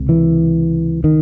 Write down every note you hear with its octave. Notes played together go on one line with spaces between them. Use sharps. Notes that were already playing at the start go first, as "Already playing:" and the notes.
Already playing: C#2 C3
E3
D#3